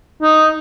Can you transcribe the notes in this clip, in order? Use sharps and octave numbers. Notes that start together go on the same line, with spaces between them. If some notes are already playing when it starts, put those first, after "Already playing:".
D#4